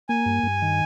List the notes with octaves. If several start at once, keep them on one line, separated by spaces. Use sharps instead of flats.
A#3 G#5
G2
G2
D#3